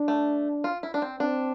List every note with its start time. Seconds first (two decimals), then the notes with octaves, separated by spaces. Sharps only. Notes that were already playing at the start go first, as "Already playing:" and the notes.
Already playing: D4
0.08 A3
0.64 F4
0.83 E4
0.94 D4
1.02 C4
1.20 C4 D4